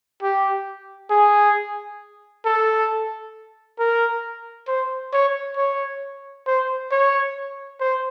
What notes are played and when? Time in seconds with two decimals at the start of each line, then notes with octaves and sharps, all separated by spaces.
0.22 G4
1.10 G#4
2.45 A4
3.79 A#4
4.68 C5
5.13 C#5
5.56 C#5
6.47 C5
6.91 C#5
7.80 C5